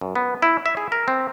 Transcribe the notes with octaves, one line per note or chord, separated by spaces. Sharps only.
F#2
B3
E4
E5
G#4
A#4
C4